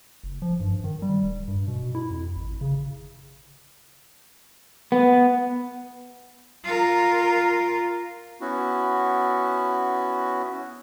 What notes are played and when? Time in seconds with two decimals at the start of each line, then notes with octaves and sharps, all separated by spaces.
0.24 F#1
0.42 F3
0.60 G2
0.84 D#3
1.02 G3
1.23 D1
1.48 G2
1.68 B2
1.95 E4
2.11 F2
2.36 G#1
2.61 C#3
4.92 B3
6.64 F4 A#4
8.41 B3 C#4 E4 F#4